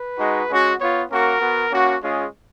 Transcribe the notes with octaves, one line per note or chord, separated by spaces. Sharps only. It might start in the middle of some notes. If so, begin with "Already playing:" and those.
Already playing: B4
G#3 D#4 F#4
G#3 C#4 F#4
B3 F4 C#5
A#3 C#4 F#4 A#4
B3 F#4
A#3 C#4 F#4
G#3 C#4 F4 G#4